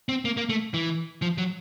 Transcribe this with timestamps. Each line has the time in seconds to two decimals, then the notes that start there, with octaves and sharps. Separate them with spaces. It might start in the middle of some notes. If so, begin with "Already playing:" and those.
0.09 C4
0.25 A#3
0.37 A#3
0.49 A3
0.74 E3
1.22 F3
1.38 F#3